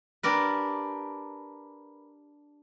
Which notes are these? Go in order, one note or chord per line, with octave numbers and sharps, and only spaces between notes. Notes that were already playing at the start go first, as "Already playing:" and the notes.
D4 G4 A#4 B4